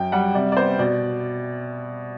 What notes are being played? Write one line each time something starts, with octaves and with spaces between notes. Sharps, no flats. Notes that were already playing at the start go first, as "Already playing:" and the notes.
Already playing: F#2 G5
G3 F#5
C3 D5
D5
B3 C5
B2 D5